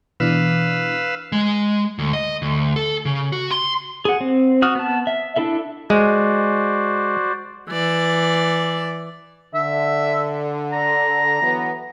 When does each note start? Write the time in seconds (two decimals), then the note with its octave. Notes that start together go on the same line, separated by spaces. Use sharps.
0.20 B2 E3 D4 B4 F5 E6
1.32 G#3
1.99 D2
2.13 D#5
2.42 D2
2.76 A4
3.05 C#3
3.32 F#4
3.51 C6
4.05 G#4 F#5
4.21 C4
4.62 F#4 D#6 F6
4.75 B3 A5
5.07 E5
5.36 D4 E4 A4 E5
5.90 G#3 F#4 C5 D5
7.69 E3 D5
9.54 D3 E5
10.73 A#5
11.41 E3 F#3 B3